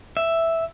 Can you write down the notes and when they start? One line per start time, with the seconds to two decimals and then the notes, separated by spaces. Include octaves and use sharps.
0.17 E5